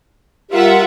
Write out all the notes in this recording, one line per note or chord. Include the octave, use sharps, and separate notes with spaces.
G3 F4 G4 A#4 E5 F#5